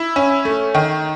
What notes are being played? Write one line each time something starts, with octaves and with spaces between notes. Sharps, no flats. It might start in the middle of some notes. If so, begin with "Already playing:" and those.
Already playing: E4
C#4
A3
D#3